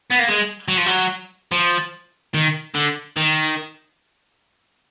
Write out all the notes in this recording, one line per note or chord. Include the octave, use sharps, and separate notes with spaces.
B3
A#3
G#3
F#3
F3
F#3
F3
D#3
D3
D#3